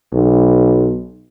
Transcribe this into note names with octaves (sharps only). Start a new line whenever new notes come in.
B1